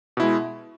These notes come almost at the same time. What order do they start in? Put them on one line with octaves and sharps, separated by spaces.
B2 E4 G#3